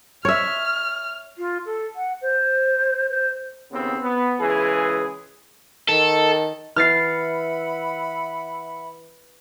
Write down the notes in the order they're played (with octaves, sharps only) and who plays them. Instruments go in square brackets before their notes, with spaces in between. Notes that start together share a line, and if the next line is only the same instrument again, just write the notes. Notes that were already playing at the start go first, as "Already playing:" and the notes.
[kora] C#5 E5 [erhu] F6
[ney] F4
A4
F#5
C5
C5
[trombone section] D#2 C#3 B3 C4
B3
C#2 E3 G#4
[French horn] D#3 [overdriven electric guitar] A4
[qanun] E3 [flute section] E5 F#5 B5 [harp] F6 A6 C7